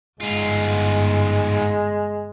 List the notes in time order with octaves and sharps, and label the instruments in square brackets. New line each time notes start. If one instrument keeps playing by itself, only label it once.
[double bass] G1 [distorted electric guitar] G#2 F4 [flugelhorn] G#3